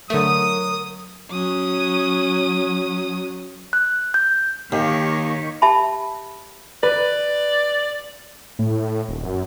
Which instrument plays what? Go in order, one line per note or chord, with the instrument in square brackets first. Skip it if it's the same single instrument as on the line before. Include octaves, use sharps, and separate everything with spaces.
[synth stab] D3 A3 [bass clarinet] F#3 [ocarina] A#4 [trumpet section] D#6
[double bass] F#3 [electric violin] C#4 D#6
[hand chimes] F#6
G6
[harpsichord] D#2 [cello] D#3 C#5 [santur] G4 D#5 F5
[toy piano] G4 E5 A5 B5
[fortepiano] B4 [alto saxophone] D5
[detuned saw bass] A2
D#1
F#2